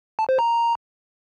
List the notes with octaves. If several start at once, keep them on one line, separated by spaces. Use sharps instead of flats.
A5
C5
A#5